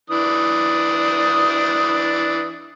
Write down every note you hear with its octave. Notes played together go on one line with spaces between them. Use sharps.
E3 D4 D#6